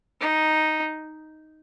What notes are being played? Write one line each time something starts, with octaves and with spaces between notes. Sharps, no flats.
D#4